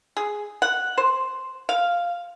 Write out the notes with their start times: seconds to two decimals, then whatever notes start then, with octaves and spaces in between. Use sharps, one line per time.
0.17 G#4
0.62 F#5
0.98 C5
1.69 F5